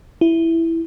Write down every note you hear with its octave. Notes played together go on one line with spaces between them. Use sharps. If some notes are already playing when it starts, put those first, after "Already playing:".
E4